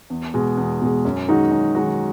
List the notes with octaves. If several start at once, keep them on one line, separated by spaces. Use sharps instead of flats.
E2
B2 G#3
E2
B2 G#3
F#2
D#3 G#3 D#4 F#4
F#2
D#3 G#3 D#4 F#4